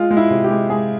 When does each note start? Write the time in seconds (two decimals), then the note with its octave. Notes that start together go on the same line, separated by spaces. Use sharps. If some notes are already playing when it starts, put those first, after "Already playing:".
Already playing: G#3 F4
0.11 G#3
0.17 E4
0.30 C3
0.44 G4
0.50 G#3
0.70 G#3 G#4